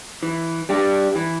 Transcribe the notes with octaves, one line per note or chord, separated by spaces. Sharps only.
E3
G3 D4 G4
E3